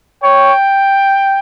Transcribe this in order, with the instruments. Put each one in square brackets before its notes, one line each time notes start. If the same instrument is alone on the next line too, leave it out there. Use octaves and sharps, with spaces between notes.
[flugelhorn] C#5 [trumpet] G5